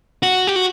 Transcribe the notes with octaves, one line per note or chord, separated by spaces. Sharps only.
F#4
G4
F#4